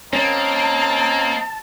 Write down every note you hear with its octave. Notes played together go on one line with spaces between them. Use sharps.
A#3 C4 C#4 D#4 A5